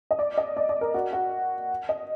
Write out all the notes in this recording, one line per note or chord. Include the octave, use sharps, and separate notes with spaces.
D#5
D5
D#5
D5
D5
A#4
F#4
F#4
D#5